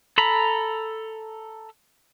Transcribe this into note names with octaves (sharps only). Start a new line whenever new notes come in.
A4 A#5 B5